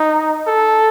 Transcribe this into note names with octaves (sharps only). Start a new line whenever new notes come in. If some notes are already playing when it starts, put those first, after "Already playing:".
Already playing: D#4
A4